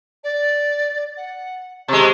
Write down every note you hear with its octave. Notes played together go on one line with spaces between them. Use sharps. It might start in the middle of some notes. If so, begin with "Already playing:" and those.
D5
F#5
C3 G#3 C#6